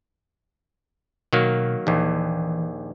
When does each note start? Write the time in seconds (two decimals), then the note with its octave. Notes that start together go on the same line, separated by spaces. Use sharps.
1.33 B2 D#3 F#3 A#3
1.87 A#1 D#2 E3